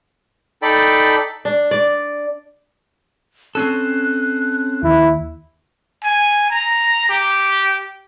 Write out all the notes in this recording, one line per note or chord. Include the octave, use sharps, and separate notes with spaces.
D#4 A4 D5 G5 B5
D4
D5
C4 C#4 A4 F#6
D#2 E4
G#5
A#5
G4